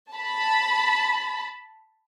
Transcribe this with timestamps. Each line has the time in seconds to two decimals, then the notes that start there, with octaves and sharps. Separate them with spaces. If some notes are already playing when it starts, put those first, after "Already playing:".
0.13 A5 B5